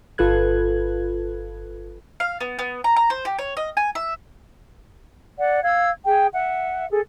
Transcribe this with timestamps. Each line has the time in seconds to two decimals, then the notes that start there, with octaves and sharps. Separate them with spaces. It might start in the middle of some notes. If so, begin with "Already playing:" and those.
0.18 G1 F4 A4 B4 F#6 G#6
2.20 F5
2.41 B3
2.59 B3
2.84 A#5
2.96 A#5
3.10 C5
3.25 G4
3.38 C#5
3.57 D#5
3.77 G#5
3.95 E5
5.38 D5 F#5
5.63 F5 E6 G#6
6.05 G#4 G5
6.33 E5 F#5
6.90 G#4 A4